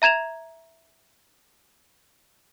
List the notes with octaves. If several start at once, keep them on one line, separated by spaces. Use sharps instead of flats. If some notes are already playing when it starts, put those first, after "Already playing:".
E5 A#5 G#6 E7 F7